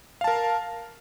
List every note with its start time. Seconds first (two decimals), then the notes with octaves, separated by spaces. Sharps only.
0.21 F5
0.24 A5
0.28 A#4